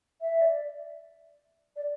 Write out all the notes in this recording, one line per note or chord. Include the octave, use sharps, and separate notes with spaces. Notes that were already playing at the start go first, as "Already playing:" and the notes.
E5
D5
D5